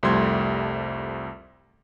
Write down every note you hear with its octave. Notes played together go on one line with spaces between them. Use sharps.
C2 F2 G3 A3 C6 G#6